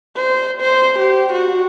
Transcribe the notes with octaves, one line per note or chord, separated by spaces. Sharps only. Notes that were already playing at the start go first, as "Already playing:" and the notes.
C5
C5
G4
F#4